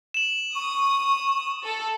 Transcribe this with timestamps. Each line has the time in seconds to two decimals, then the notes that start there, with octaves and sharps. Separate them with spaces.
0.14 E7 F#7
0.55 C#6 D#6
1.64 A4